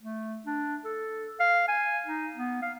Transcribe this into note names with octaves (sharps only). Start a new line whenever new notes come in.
A3
D4
A4
F5
G#5
D#4
B3
F5